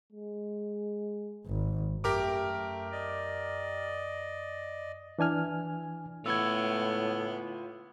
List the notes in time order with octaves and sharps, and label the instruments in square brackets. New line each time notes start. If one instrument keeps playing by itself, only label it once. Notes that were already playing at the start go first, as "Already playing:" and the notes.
[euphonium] G#3
[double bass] G#1
[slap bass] F#2 [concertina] A3 [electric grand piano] G4 A#4 D6
[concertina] D5 D#5
[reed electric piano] E3 D4 G#5 F6
[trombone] A2 [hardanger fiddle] B3 [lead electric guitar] F4 C#5 [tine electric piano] E6 G#6